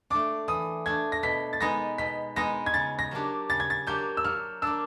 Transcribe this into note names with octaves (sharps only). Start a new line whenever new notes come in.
A3 D4 D6
E3 D#6
A3 D4 G#6
A#6
B2 B6
A6
G#3 B3 D#4 A#6
B2 B6
G#3 B3 D#4 A#6
G#6
C#3 A6
A#6
F#3 A#3 D4 G4
C#3 A6
G#6
A6
F#3 A#3 D4 G4 G6
E6
F#3 F6
A#3 D4 E6